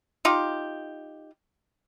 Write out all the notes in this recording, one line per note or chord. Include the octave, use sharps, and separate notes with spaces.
D#4 F4 G4